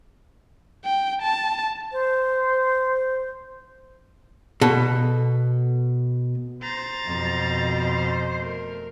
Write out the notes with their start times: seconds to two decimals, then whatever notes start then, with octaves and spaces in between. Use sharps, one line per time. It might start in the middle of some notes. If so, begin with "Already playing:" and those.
0.84 G5
1.22 A5
1.92 C5
4.61 B2 A4
6.62 C5 A#5 A6
7.05 F2 B2
8.37 A3 A#4